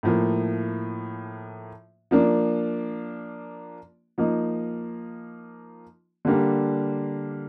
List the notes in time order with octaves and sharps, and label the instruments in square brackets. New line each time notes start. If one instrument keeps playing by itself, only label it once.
[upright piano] A2 F3 A#3
F3 A#3 D4
F3 A#3 D#4
D3 G3 A#3 D4